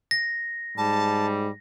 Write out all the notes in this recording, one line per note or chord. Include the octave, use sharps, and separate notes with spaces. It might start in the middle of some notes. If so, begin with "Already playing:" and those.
A#6
G#2 G3 A5